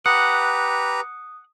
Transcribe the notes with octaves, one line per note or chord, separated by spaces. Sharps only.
G4 B4 F#5 A#5 D#6